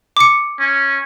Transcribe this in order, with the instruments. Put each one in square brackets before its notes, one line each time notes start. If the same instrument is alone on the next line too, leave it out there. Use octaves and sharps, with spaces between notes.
[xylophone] D6 C#7
[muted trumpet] C#4